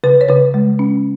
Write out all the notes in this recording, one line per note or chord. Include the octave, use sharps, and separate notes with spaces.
C#3 B4
C#5
C#3 B4
G#3
C#4